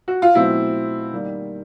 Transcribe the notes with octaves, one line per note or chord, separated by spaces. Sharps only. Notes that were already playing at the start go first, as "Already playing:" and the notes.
F#4
F4
B2 F#3 A3 C4 E4
D#3 G3 A#3